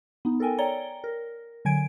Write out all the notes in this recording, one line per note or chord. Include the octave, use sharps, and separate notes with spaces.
B3 D#4
A4 A#4 G5 G#5
C#5 D5 G5 A#5 G7
A#4
D3 F#3 G#5 G#6 D7